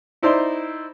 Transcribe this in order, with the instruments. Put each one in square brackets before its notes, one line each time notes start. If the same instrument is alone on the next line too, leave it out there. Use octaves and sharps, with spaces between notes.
[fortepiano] D#4 E4 C5 D5 A#5 C6